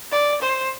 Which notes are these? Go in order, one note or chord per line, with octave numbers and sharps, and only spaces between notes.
D5
C5